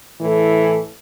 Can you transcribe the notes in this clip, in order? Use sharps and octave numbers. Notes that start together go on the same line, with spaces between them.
A2 E3 A4